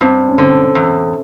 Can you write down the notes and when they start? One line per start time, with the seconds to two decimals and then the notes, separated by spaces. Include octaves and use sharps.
0.01 G2 C4
0.28 C#4
0.38 D3 C4
0.75 E2